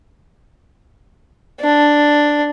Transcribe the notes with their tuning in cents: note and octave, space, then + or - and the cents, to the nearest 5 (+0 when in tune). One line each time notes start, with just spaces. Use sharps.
D4 +0